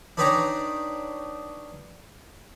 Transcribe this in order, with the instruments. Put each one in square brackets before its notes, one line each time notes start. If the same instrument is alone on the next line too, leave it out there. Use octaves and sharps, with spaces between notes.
[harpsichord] D4 D#4 B4 C#5 G5 A#5